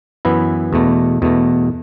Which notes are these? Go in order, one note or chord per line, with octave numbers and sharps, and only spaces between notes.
F#2 E3 B3 E4 B4
E2 B2 A3
E2 B2 A3